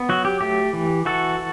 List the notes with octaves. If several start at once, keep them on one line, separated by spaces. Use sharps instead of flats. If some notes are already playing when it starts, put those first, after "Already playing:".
Already playing: B3
F#3 F#4
G4
A3 G4
E3
E3 F#4 A4